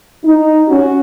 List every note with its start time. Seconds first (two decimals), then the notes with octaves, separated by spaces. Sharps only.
0.24 D#4
0.68 C#4 F#4